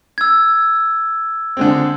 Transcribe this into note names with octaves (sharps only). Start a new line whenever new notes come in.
E6 G#6
D3 G#3 C4